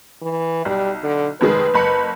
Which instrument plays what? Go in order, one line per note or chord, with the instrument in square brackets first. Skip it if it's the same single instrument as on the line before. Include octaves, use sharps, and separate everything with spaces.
[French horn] E3
[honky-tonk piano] B1 [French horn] G3
[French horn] D3
[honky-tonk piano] F1 D#3 G#3 [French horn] B4
[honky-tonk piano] F#1 B5 C#7